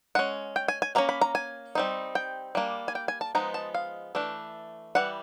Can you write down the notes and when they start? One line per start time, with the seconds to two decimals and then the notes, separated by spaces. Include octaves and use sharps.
0.15 G#3 C#4 F#5
0.56 G5
0.68 G#5
0.82 G#5
0.95 F#3 A#3 C#4 A#5
1.09 B5
1.21 A#5
1.35 G#5
1.75 G3 C4 D#4
2.15 G5
2.55 G3 A#3 D4
2.88 G#5
2.95 G5
3.08 G#5
3.21 A5
3.35 F3 G#3 B3 D#4 A#5
3.54 A5
3.74 F5
4.15 E3 A3 D4
4.95 E3 G3 F#5